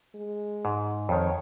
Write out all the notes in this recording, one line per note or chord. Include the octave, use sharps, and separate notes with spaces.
G#3
G#2
F2 D#3 C#5